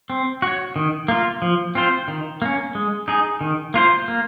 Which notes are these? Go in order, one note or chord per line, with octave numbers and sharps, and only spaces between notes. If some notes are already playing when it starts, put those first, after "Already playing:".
C4
F#4 C#5
D#3
A#3 F4
F3
C4 F4 C5
D#3
A#3 C#4
G#3
D#4 G#4
D#3
A#3 F4 C5
A#3